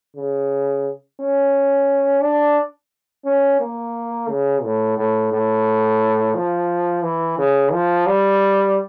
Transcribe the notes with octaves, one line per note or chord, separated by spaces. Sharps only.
C#3
C#4
D4
C#4
A#3
C#3
A2
A2
A2
F3
E3
C#3
F3
G3